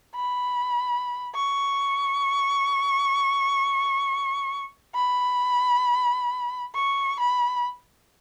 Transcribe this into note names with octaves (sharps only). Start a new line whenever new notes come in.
B5
C#6
B5
C#6
B5